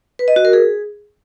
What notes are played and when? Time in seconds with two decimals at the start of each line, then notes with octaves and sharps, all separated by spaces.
0.19 B4
0.28 D#5
0.36 F#4
0.45 A#4
0.53 G#4